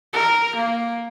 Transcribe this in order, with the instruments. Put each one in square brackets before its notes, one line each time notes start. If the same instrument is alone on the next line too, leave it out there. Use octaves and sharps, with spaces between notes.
[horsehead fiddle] A#4
A#3